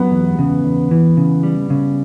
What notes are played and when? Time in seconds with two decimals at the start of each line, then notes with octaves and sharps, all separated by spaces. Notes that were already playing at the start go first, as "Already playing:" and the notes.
Already playing: F#3 B3
0.12 E2
0.39 C#3
0.65 E2
0.91 E3
1.17 C#3
1.43 G3
1.70 C#3